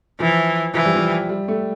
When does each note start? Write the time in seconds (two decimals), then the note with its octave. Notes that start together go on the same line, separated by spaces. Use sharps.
0.20 E3 F3
0.74 E3 F3
0.85 G3
0.95 F3
1.29 G3
1.48 A3